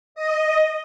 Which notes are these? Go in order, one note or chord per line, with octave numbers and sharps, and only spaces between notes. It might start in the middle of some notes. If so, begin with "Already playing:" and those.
D#5